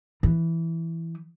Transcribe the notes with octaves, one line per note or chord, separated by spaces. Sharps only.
E3